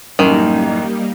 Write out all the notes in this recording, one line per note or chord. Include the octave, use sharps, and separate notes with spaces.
A1 F#2 D#3 G3 A#3 D#4